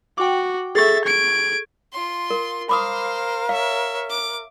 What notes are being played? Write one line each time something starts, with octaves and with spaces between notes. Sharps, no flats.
F#4 G5 D6
G#4 A4 E5 C#6 A6
G#6 D7
F4 C6
A#4
A#4 C5 F5 B5 D6 D#6
C#5 E5 F5
D6